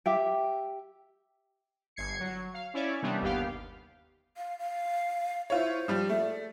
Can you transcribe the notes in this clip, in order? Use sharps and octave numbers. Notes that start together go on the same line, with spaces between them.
G4 E5 G5
G1 G#6 C7 C#7
F#3
F5
C#4 E4 C#5 D5
C3 D#3 E3 G3 B3 D4
G1 D#2 B3 G4 F5
F5
F5
E4 F4 C5 C#5
F3 G3
A3 D5